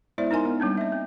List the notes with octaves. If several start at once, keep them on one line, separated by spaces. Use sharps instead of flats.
G#3 B3 E4 C5 D5 E5
D#4 A#4 D#5 G#5 C6
B3
G3 A#3 C4 D4
D#5 E5
C4